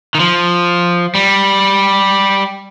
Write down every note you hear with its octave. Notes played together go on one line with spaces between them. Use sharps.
D#3
F3
G3